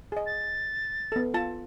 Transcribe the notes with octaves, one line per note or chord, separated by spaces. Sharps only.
G#4 D#5
A6
B3 A4
F4 A5